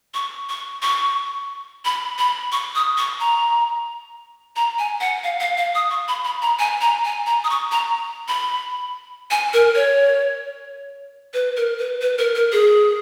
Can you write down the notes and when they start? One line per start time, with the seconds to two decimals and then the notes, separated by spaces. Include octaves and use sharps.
0.14 C#6
0.49 C#6
0.83 C#6
1.85 B5
2.18 B5
2.52 C#6
2.75 D#6
2.98 C#6
3.20 A#5
4.56 A#5
4.79 G#5
5.01 F#5
5.24 F5
5.40 F5
5.58 F5
5.75 D#6
5.91 C#6
6.08 B5
6.25 B5
6.42 A#5
6.59 G#5
6.81 A#5
7.05 G#5
7.27 A#5
7.44 D#6
7.50 C#6
7.72 A#5
8.28 B5
9.31 G#5
9.53 A#4
9.75 C#5
11.34 B4
11.57 A#4
11.79 B4
12.01 B4
12.19 A#4
12.35 A#4
12.52 G#4